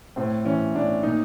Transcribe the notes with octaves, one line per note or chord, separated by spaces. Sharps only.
A2 C4
E3 C#4
A2 D4
A#2 D#4